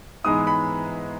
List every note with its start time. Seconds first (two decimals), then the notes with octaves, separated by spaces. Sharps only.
0.24 G#2 E3 G#3 B3 E4 D#6
0.47 B5